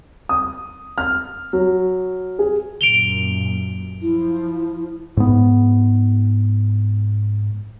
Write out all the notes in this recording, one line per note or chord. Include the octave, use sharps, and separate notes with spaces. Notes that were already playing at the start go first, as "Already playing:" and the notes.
D#6
F6
F#3
G#4
F#2 A#2 D7 F7 G7
F3 E4
G#2 B3